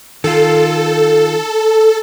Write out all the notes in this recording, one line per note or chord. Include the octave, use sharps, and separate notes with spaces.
D#3 F4 A4